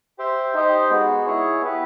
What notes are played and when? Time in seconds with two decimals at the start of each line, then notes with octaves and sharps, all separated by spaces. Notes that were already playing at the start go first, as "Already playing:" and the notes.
0.18 G4 C5 E5 G5
0.54 D#4 G4 C5 D#5 G5
0.90 G#3 B3 D#4 F#4
1.26 E4 G#4 C#5
1.61 B3 E4 G4 B4